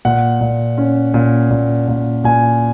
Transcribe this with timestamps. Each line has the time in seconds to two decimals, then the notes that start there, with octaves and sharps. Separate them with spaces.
0.05 A#2 F#5
0.41 A#2
0.78 C#4
1.14 A#2
1.51 A#2
1.88 A#2
2.24 A#2 G#5